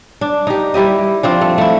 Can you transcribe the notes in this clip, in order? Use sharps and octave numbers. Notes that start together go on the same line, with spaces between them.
D4
D#4 G4
G3 E4 G4 D#5
F3 C4 D4
A3
A3 E4